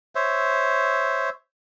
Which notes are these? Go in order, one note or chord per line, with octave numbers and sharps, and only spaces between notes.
C5 C#5 E5